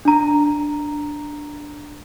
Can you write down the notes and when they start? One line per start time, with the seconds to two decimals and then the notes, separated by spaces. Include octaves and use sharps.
0.05 D4 A#5